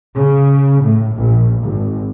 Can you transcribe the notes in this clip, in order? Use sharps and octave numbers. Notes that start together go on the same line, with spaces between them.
C#3
A2
A#1
G#1